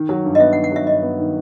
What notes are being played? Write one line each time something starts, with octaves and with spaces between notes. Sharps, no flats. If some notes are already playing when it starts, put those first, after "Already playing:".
Already playing: D#3
F#3
G2
D#5
B3 E5
F#5
D#3
F#5
F#3 E5
G2 D#5
B3
D#3